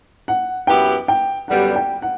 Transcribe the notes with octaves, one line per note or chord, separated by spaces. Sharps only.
F#5
F#2 E3 B3 E4 G4 G5
G5
F#2 D3 G3 B3 F#5
G5
F#5